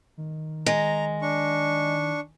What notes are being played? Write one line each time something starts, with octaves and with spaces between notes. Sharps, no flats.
D#3
G#3 A#5
D4 C#6